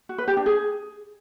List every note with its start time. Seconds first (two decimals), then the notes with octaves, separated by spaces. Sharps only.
0.09 F#4
0.18 B4
0.28 G4
0.37 D4
0.46 G#4